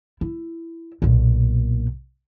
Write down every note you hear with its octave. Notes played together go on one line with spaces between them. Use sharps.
E4
B1 A#2